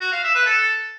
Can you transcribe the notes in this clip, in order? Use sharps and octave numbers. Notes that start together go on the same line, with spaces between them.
F#4
F5
E5
B4
A4